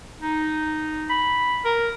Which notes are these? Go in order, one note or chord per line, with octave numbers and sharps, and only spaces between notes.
D#4
B5
A#4